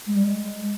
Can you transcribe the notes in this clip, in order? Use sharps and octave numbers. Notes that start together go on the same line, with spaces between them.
G#3
G3
G#3